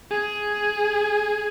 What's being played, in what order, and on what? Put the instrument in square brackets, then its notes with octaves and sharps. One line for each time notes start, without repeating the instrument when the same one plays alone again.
[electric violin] G#4